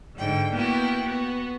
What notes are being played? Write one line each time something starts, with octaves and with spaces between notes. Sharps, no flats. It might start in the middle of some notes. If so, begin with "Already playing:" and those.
G#2 D3 G5
A#3 B3 E4 F#4 G5
B3 F#4